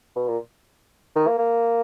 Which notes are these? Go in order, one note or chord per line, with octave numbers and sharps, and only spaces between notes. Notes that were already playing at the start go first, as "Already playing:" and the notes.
B2
A#2
D#3
A#3
A#3